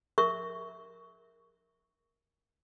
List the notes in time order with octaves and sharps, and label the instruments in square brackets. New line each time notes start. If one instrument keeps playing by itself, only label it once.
[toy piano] A#4 E5 C#6